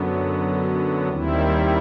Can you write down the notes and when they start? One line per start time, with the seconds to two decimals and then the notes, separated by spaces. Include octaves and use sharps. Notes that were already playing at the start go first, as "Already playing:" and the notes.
Already playing: F#2 D3 F#3 B3
1.08 D#2 D#3 G3 C4 E4